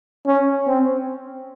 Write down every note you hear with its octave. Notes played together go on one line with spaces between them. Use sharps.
C#4
C4